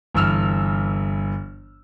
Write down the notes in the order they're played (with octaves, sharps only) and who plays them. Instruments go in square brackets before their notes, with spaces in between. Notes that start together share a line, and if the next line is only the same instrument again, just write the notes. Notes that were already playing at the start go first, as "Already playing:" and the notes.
[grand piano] G1 E3 E6 F6